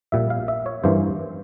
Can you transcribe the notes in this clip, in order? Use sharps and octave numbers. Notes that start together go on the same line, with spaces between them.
A#1 A#2 G3 E5
F5
E5
C#5
G2 E3 A#3 C#4 C5